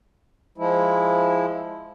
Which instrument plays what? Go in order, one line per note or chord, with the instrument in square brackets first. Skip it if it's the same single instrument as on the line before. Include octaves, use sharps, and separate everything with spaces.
[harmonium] F3 G#3 E4